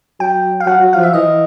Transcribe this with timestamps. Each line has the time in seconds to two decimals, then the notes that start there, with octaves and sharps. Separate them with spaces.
0.20 F#3 G5
0.60 F5
0.66 F#3 F#5
0.83 F#3
0.93 F3 F5
1.03 E5
1.13 E3 D#5